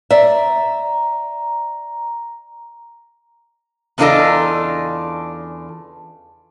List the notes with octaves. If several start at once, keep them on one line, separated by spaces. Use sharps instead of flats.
D5 E5 A#5
E2 C#3 D4 F4 A4 D#5